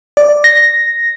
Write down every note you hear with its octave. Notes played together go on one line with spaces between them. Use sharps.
D5
A#6